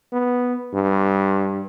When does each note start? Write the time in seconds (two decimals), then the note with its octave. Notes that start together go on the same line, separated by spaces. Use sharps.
0.13 B3
0.74 G2